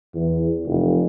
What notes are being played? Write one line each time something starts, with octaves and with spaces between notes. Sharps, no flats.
E2
F1